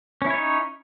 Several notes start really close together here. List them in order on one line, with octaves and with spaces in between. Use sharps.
C#4 E4 C#5 D#4